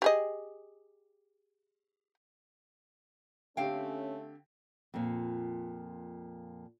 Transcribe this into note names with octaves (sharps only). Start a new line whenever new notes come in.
G4 G#4 D#5
D3 A3 C4 C#4 G4 F5 G5
F2 A#2